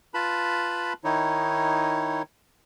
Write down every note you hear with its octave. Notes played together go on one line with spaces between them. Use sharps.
F4 B4 A5 B5
D#3 D#4 E4 C#5